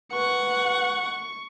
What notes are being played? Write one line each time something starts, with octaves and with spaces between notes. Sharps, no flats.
B4 F#5 C#6